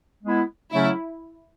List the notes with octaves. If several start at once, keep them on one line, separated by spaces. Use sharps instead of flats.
G#3 B3 E4
C#3 F#3 A3 C#4 E4